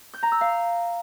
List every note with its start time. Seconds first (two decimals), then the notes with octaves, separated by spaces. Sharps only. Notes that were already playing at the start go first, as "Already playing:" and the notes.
0.14 G6
0.23 A#5
0.32 E6
0.41 F5